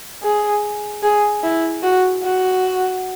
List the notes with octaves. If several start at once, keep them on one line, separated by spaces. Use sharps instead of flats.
G#4
G#4
E4
F#4
F#4